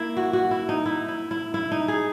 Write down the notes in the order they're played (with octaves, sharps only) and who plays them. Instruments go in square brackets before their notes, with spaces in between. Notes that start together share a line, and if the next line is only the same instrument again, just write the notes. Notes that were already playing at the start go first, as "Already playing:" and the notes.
Already playing: [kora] A#3 E4
F#4
F#4
E4
D#4
E4
E4
E4
E4
D#4
G#4